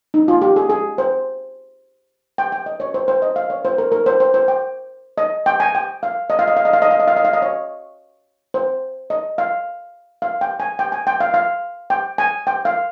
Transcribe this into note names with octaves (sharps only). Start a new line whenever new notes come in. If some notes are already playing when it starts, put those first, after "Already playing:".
D#4
F4
G4
G#4
G#4
C5
G5
G5
D#5
C#5
C5
C5
D#5
F5
C#5
C5
A#4
A#4
C5
C5
C5
G5
D#5
G5
G#5
G5
F5
D#5
F5
D#5
F5
D#5
F5
D#5
F5
D#5
F5
D#5
F5
D#5
C#5
C5
D#5
F5
F5
G5
G#5
G5
G#5
G5
F5
F5
G5
G#5
G5
F5